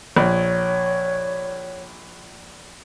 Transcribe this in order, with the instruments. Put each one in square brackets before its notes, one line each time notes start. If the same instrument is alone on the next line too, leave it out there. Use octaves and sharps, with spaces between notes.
[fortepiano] A#1 [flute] C#5